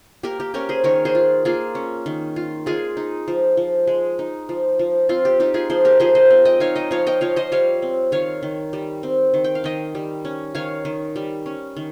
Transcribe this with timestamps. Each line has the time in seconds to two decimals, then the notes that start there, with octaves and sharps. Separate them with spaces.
0.23 A#3 G4 A#4
0.40 G4
0.54 C#4 G4 A#4
0.69 G#4 C5
0.84 D#3 A#4 C#5
1.05 G#4 C5
1.15 F4
1.45 A#3 F4 G#4
1.75 C#4
2.06 D#3
2.36 F4
2.66 G#3 F4 G#4
2.97 D#4
3.28 F3
3.57 F3
3.87 G#3
4.19 D#4
4.49 F3
4.79 F3
5.09 C4 F4
5.25 G4
5.40 D#4 G4
5.54 F4 G#4
5.70 F3 G#4 C5
5.85 G4 A#4
6.00 F3 G#4 C5
6.15 C5 D#5
6.30 C4
6.45 D#5 G5
6.60 D#4 C#5 F5
6.76 D#5 G5
6.91 F3 C#5 F5
7.07 D#5 G5
7.21 F3 C#5 F5
7.36 C5 D#5
7.52 G3 C#5 F5
7.82 C4
8.12 D#3 C#5 F5
8.43 D#3
8.73 G3
9.03 C4
9.34 D#3
9.44 G5
9.55 F5
9.64 D#3 D#5 G5
9.95 G3
10.25 C#4
10.55 D#3 C#5 F5
10.85 D#3
11.16 G3
11.46 C#4
11.76 D#3